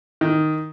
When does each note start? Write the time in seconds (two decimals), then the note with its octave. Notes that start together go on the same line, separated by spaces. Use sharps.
0.21 D#3